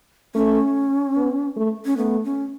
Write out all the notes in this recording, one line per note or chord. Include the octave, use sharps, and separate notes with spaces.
A3 C#4
B3
A3
C#4
A3 B3
C#4